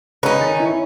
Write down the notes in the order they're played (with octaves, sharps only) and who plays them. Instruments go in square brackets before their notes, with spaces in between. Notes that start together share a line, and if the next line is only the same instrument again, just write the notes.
[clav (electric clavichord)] C#3 G#3 F#4 [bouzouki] C#4 D#4 [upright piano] B4 A#5
[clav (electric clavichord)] D#3 [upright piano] A6
[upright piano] E4 C#5